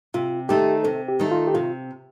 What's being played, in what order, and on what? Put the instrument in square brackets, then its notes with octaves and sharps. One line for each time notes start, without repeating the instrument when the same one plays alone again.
[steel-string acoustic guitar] C3 [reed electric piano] F4
[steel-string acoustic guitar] D#3 A3 D#4 [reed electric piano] G4
[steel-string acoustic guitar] C3 [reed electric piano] A4
[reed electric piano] G4
[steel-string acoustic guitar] D#3 A3 D#4
[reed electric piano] F4
G4
[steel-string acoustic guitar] C3 [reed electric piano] F4